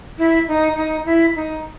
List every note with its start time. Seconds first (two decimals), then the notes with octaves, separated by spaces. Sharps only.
0.18 E4
0.48 D#4
0.76 D#4
1.06 E4
1.36 D#4